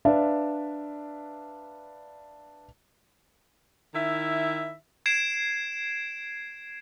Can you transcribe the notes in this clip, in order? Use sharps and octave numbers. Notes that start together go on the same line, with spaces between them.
D4 B4 D5 E5 F5 A5
D#3 E4 E5
G#6 C7 D7 E7